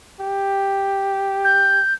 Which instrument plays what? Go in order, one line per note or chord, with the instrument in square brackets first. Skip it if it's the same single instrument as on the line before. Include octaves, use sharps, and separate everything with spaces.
[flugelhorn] G4
[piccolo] G6